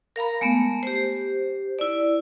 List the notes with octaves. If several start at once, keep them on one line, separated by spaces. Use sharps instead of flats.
A#4 F5 A#5 B5
G#3 A3 B3
G4 C5
E4 D5